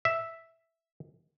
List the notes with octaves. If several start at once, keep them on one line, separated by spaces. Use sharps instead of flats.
E5